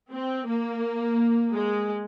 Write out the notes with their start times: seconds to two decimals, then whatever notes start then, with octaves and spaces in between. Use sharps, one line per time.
0.11 C4
0.46 A#3
1.53 G#3